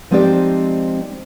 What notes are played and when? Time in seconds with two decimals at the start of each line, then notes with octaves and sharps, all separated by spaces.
0.11 F3 G#3 C4 D#4 G4 D5